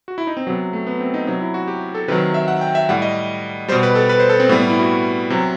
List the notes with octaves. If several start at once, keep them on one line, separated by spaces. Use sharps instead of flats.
F#4
E4
D#4
C4
C3 F#3 B3
A3
B3
C4
D#4
C3 F#3 D#4
E4
F#4
G4
A4
C3 D#3 F#3 B4
E5
F#5
G5
E5
A2 G3 F#5
D#5
B2 G3 C5
B4
A4
B4
C5
A4
C4
A2 G3 B3
B3
E4
F#4
C3 F#3